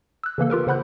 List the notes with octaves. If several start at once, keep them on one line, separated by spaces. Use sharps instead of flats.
E6 F#6
C#3 E3 A#3 A4
F4 G4 A#4 B4
C#3 C5 F#5 B5 F#6 G6